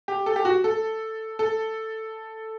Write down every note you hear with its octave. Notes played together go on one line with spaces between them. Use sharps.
G4
A4
G4
F#4
A4
A4